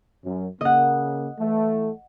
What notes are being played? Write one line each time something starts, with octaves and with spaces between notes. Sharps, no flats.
F#2
C#3 A#3 D#5 F#5
E3 A3